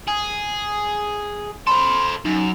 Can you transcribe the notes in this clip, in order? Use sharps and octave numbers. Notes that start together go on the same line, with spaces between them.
G#4
A4 C5 B5 C6
F#2 D#4